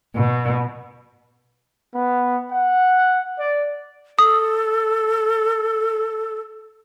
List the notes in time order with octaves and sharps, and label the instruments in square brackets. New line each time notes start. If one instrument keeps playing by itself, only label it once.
[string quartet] B2
[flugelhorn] B3
F#5
D5
[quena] A4 [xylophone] D#6